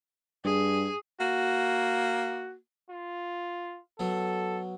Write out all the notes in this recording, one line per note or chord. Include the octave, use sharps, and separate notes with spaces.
G2 G#4
A#3 F#4
F4
B2 F#3 A4